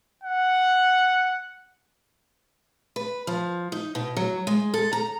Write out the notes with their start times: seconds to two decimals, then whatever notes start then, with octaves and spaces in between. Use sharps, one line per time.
0.23 F#5
2.96 B4
3.27 F3
3.72 D#4
3.95 B2
4.17 F#3
4.47 G#3
4.74 A4
4.93 A#5